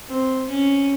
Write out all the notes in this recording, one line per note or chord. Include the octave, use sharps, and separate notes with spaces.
C4
C#4